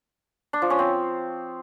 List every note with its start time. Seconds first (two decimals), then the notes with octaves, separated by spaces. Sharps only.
0.53 D4
0.62 F3
0.70 C#4
0.79 C4